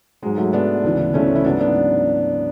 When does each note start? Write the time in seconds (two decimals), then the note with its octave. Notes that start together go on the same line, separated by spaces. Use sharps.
0.22 G#2 F#3 G#3
0.38 F#3 A3
0.53 G#2 F#3 B3 D4
0.84 D2 C#3 E3
1.14 D2 C#3 E3 A3 C#4
1.35 E4
1.44 G#2 F#3 B3 D4
1.60 B3 D4